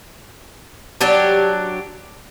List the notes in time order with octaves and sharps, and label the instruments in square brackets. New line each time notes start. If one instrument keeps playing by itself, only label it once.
[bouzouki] F#3 D4 G4